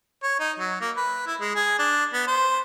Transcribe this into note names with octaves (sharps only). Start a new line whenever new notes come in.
C#5
D#4
F#3
A#3
B4
E4
G#3
G#4
D4
B3
C5